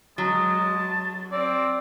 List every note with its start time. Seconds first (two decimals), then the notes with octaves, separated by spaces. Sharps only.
0.18 F#3 G#3 A5
1.32 C4 D5